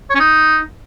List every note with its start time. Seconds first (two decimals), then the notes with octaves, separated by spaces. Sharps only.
0.10 C#5
0.15 C#4
0.20 D#4